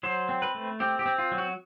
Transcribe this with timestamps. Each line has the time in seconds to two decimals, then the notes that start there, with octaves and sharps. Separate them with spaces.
0.03 F#3 C5
0.29 C4
0.42 B4
0.55 A3
0.80 C4 G4
0.99 G4
1.06 C4
1.18 F4
1.32 F#3
1.38 F#4